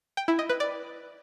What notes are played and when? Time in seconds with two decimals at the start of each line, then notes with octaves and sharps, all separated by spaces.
0.17 G5
0.28 E4
0.39 D#5
0.49 B4
0.60 D5